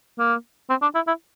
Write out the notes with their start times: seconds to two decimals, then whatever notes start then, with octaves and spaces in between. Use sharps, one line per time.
0.19 A#3
0.70 C4
0.82 D4
0.95 E4
1.07 E4